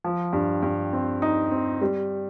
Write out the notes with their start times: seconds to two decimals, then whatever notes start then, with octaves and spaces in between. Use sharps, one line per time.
0.04 F3
0.33 G2
0.63 G2
0.93 C4
1.22 D#4
1.52 C4
1.81 G3